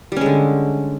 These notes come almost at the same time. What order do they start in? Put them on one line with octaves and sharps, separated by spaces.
G3 C#4 G#3 D3